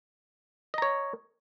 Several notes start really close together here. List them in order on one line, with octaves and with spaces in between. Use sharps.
D#5 A#5 C#5